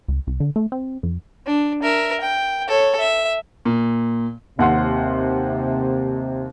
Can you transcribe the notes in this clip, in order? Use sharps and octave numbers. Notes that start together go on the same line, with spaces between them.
C#2
C2
D3
A3
C4
F2
D4
A#4 E5
G5
A4 C#5
E5
A#2
D#2 C3 F#5 C6